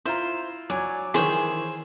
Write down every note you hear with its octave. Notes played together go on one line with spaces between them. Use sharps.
E4 F4 C5 A#5
F#3 D5 G#5
D#3 E3 G#4 C5 C#5